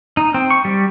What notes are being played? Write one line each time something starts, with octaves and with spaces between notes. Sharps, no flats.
D#4
C4
C#6
G3